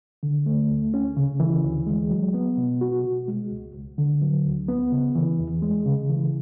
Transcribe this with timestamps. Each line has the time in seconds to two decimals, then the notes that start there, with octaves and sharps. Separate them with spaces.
0.23 D3
0.46 A3
0.70 D2
0.94 C#4
1.17 C#3
1.40 E3
1.64 D2
1.87 G#3
2.11 F#3
2.34 B3
2.57 B2
2.81 F#4
3.04 B2
3.28 G#3
3.51 C#2
3.75 C#2
3.98 D3
4.22 F#3
4.45 D2
4.68 B3
4.92 C#3
5.15 E3
5.39 E2
5.62 G#3
5.86 C#3
6.09 E3